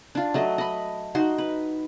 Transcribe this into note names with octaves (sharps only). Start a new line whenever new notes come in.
D4 F4
F#3 A3 D#5
D#5 B5
D#4 F#4 C6
B4